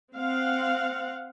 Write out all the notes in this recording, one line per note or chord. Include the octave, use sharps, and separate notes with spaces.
C4 F5 F#5